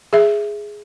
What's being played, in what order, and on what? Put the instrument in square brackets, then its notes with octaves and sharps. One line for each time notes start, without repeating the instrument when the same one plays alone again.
[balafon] G#4 E5